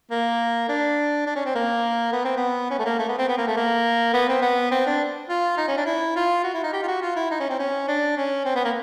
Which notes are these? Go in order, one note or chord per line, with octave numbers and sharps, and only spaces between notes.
A#3
D4
D4
C#4
C4
A#3
B3
C4
B3
C#4
A3
A#3
A3
B3
C4
B3
A#3
A3
A#3
B3
C4
B3
C4
D4
F4
D#4
C#4
D4
E4
F4
F#4
E4
D#4
G4
F4
F#4
F4
E4
D#4
C#4
C4
C#4
D4
C#4
C4
B3
A#3